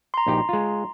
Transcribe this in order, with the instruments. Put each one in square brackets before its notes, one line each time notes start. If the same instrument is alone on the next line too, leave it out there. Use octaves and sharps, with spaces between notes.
[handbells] A#5 C6
[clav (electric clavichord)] A#1 D#4 G4
G#3 F4